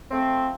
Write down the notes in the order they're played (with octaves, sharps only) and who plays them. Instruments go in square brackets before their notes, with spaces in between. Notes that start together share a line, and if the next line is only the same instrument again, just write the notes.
[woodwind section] F3 A3 C4